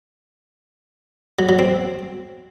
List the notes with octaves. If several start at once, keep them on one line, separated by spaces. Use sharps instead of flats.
F#3
F#3
C4